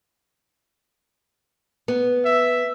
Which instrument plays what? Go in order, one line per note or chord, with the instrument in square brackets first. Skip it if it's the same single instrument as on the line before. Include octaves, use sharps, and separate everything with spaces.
[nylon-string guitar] B3
[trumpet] E5